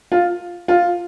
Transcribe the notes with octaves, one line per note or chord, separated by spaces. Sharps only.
F4
F4